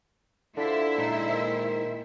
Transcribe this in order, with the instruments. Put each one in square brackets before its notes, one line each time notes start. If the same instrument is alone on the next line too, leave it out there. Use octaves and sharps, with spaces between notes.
[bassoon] D3 [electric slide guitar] D4 F4 [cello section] E4 C5 E5
[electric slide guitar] A#2 G#3 D#4
[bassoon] D#3